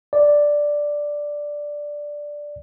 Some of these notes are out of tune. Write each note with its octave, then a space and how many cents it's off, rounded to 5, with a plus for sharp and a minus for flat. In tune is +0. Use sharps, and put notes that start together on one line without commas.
D5 +0